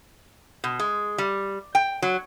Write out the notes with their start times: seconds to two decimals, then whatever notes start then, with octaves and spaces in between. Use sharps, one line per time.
0.64 B2
0.79 G#3
1.18 G3
1.75 G5
2.02 F#3